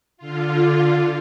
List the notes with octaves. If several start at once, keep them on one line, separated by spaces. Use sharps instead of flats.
D3 F4